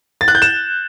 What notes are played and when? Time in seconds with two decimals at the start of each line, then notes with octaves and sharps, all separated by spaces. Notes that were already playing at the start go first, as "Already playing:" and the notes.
0.21 A6
0.28 F#6
0.35 G6
0.42 E7